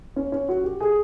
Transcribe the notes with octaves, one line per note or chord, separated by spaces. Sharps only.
C#4
C#4
F#4
G4
G#4